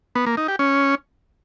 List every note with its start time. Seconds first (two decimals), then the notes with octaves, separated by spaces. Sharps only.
0.15 B3
0.26 A#3
0.37 D#4
0.48 G4
0.59 C#4